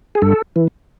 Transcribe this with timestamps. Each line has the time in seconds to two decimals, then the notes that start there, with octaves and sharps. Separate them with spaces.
0.15 G#4
0.22 G2 A4
0.56 E3